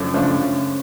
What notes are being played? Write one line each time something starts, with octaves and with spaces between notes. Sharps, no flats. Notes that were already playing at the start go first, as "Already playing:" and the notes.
Already playing: F#2 C#3 F3 A3 D4
C#3 F3 A3 D4
C#3